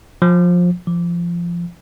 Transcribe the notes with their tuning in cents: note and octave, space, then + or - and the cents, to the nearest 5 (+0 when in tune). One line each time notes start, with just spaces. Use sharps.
F3 +20
F3 -20